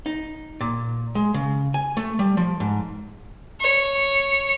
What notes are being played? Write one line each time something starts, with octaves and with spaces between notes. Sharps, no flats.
D#4
A#2
G#3
C#3
G#5
A3
G3
F3
G#2
C#5